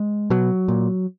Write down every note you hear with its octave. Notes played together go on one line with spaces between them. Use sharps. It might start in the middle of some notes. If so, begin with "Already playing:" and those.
Already playing: G#3
B2 F#3
A#2